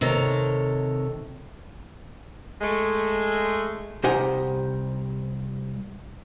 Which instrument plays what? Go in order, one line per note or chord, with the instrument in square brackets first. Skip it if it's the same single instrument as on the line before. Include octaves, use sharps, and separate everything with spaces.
[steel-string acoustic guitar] C3 D#3 A4 C#5 A#5
[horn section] G#3 A3
[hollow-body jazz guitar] C2 D#4 G4 C5 F#5 G#5